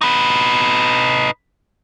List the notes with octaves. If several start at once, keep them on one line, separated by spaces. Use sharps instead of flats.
D#4 B4